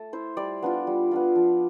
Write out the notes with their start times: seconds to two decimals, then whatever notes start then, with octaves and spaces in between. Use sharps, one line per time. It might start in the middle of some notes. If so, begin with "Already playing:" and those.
Already playing: A3 A5
0.13 E4 C5
0.37 G3 D5
0.62 B3 D4 F4
0.87 G3
1.11 B3 D4 F4
1.36 F3